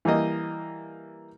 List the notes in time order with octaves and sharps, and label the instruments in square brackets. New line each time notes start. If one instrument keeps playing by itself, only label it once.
[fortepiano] E3 G3 A#3 D#5